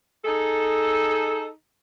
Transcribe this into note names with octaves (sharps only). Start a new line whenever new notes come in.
D#4 G#4 A4